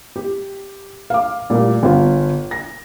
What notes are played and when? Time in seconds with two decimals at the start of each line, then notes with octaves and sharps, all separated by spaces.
0.16 G4
1.10 F5 D6
1.50 A#2 G3 A3
1.83 G1 F4
2.51 A#6